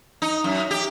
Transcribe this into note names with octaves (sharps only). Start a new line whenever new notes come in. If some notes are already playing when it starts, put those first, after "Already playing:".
D#4
F#2
G4